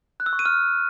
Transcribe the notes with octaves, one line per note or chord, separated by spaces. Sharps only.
F#6
E6
C#6
D#7
F6